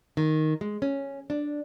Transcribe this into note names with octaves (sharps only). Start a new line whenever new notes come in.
D#3
G#3
C#4
D4